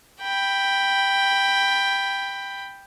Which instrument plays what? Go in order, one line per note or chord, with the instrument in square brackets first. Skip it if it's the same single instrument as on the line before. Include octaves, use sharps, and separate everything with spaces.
[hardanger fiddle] G5 B5